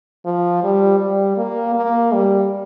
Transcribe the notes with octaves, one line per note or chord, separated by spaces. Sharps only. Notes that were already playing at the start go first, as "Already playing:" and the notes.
F3
G3
G3
A#3
A#3
G3